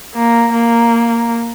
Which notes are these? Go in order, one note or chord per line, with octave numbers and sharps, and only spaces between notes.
A#3
A#3